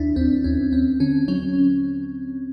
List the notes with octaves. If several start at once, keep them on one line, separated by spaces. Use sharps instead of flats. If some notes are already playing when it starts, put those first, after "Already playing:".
Already playing: D#2 D4 E4
D#2 C4 D4
D#2 C#4
D#2 C4
D3 C#4
F#3 C#4